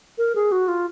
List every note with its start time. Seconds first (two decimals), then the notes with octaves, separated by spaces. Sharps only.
0.18 A#4
0.35 G#4
0.52 F#4
0.68 F4